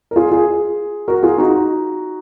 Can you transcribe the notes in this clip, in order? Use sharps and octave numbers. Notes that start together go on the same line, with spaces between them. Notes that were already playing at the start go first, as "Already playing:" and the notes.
A#4
F4 G#4
F4 G#4
F#4 A#4
F4 G#4
D#4 F#4